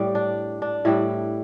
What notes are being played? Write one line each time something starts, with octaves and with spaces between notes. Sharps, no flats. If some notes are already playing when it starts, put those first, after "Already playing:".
Already playing: A2 G3 D5
D4
D4
A2 G3 D4 E4